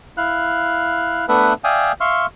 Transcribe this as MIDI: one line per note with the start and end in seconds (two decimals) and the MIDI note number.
0.17 1.25 64
0.17 1.25 77
0.17 1.25 90
1.29 1.53 57
1.29 1.53 59
1.29 1.53 62
1.29 1.53 71
1.29 1.53 76
1.29 1.53 78
1.64 1.92 74
1.64 1.92 76
1.64 1.92 77
1.64 1.92 79
1.64 1.92 80
1.64 1.92 87
2.01 2.26 76
2.01 2.26 77
2.01 2.26 84
2.01 2.26 85
2.01 2.26 89